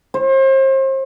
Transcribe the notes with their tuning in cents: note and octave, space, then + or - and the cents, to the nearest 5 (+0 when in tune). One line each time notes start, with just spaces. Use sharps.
C5 +35